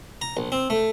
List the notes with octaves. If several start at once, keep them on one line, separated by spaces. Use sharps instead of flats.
A#5
A#1
C4
A3